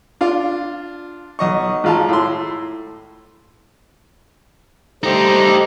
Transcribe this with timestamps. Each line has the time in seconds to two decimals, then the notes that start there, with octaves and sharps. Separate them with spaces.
0.21 D4 F4
1.39 B1 D#5 C#6
1.84 G#1 F4 A5
2.09 A2 C6
5.03 G3 A3 D#4 G4 C5